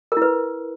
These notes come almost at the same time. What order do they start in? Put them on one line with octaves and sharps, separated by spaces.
A#4 E4 B4